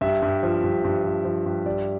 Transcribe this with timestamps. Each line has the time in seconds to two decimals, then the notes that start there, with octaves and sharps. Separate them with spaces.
0.01 G2 E5
0.22 G2
0.43 F3
0.64 G2
0.84 G2
1.04 F3
1.25 F3
1.46 G2
1.65 G2 D5